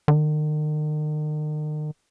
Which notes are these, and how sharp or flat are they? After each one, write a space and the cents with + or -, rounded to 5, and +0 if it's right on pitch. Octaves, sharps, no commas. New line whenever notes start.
D#3 -40